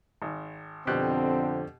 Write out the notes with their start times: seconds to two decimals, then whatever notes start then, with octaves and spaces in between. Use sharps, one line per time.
0.22 G#1
0.87 F2 B2 D3 C4 G4 F#6